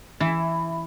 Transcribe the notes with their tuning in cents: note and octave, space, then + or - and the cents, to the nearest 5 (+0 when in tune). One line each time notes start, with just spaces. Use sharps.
E3 +0 E4 +10